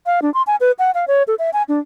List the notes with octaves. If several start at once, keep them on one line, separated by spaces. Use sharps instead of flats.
F5
D4
C6
G#5
B4
F#5
F5
C#5
A4
E5
G#5
D4